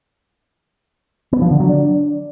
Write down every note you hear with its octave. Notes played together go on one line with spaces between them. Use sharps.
B3
F3
D3
F#3
D4